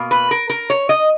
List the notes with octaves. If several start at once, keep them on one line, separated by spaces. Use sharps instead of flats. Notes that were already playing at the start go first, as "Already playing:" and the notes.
Already playing: B2 A#3
B4
A#4
A#4
C#5
D#5